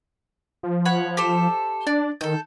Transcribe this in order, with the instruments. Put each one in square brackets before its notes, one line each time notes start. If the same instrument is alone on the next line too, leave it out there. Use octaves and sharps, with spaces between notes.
[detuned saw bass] F3
[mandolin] C#5 F#5 B5
G4 A4 C5
[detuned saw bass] D4 [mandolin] D5
[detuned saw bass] D#3 [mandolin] A4 G6